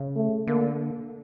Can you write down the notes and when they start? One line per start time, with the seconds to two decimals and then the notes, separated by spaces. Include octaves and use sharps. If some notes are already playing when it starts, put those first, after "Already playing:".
Already playing: C#3
0.16 A3
0.47 D3 A#3